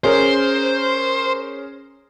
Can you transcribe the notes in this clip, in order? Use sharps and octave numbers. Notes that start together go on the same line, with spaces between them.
C#4 G#4 A#4 C5